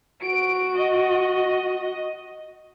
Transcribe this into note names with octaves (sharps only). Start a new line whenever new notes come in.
F#4 D7
D#5